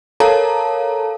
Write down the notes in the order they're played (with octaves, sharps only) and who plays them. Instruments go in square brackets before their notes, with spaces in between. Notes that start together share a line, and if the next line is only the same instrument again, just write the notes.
[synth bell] A4 A#4 C#5 F5 A5 A#5